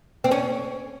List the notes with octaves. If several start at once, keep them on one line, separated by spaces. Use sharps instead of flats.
C4
C#4